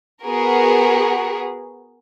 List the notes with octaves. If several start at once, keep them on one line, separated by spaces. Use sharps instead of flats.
B3 F#4 G#4 A#4